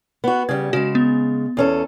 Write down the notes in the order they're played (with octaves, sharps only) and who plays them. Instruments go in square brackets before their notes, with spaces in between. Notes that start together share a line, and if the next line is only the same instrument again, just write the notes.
[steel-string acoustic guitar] B3 F#4
[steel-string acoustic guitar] C#3 G3 [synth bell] G#6
[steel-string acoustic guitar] C#3 G#3 [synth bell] F#4
[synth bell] B3
[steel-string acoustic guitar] E2 C#4 A4